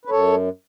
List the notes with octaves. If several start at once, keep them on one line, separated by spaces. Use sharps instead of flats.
B4
F#2 A4 C#5